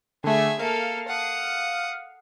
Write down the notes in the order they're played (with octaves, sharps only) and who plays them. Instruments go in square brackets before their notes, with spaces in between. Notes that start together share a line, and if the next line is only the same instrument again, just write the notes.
[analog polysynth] D3 A3 [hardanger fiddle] G#4 E5
[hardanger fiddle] A#3 A4 [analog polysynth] F5
[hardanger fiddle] F#5 D#6